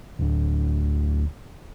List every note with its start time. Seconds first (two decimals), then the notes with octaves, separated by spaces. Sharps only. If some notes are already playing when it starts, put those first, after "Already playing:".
0.19 D1 D2